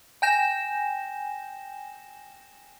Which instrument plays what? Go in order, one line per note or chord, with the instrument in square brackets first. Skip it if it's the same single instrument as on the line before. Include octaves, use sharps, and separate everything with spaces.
[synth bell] G5 G#5 G6 A#6 E7